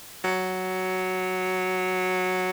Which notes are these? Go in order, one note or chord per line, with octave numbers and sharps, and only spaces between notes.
F#3